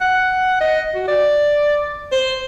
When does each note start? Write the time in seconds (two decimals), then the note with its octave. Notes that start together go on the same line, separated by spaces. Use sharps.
0.01 F#5
0.60 D#5
0.94 F#4
1.08 D5
2.12 C5